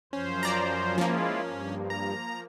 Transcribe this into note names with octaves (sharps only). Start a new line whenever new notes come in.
F#2 F3 C#4 C5
D5 A#5
F3 G#3 A#3 E4 F4
G2
A#5